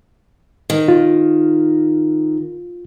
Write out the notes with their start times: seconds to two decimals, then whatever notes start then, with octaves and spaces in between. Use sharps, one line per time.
0.70 D#3
0.88 F4